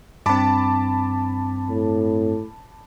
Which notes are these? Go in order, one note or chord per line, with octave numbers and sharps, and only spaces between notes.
G2 C4 A5 B5 D6
A2